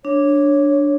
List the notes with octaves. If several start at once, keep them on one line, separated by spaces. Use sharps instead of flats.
D4 C#5